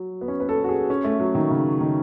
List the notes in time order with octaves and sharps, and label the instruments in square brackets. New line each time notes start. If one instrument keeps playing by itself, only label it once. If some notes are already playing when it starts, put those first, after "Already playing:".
Already playing: [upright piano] F#3
B3
C#4
B4
A4
F#4
G#4
C#4
A3
F#3
D#3
C#3
D#3